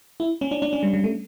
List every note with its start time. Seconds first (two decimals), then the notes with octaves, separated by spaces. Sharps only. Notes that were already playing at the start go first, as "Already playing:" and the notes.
0.20 E4
0.41 C#4
0.51 D4
0.62 D4
0.73 C#4
0.83 G3
0.94 G3
1.04 A3